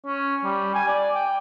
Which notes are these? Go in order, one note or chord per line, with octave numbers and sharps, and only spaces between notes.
C#4
G3
G#5
D5
G5